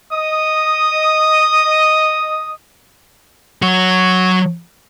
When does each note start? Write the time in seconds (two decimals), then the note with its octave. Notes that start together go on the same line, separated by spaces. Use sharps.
0.12 D#5 D#6
3.62 F#3 F#4